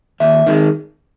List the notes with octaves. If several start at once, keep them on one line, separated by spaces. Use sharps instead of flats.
D#2 E5
D#3 G#3